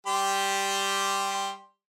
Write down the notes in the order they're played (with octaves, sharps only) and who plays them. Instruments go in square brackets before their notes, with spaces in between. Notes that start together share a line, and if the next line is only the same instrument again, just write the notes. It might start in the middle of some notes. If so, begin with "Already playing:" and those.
[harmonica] G3 G4 C6